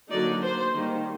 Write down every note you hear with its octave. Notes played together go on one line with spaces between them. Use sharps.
D3 F#3 A#3 D#4 D5
C5
D#3 G3 A#3